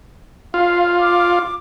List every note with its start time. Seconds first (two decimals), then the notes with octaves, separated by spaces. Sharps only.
0.54 F4 F5
1.00 D6